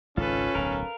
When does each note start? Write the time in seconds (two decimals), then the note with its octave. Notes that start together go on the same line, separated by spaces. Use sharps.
0.17 G#1 C#2 D#3 C#4 F4 A4 B4
0.55 D1 B1 A#4 F5